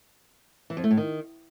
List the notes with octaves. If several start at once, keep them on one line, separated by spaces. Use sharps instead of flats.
E3
F2
A3
A2
D#3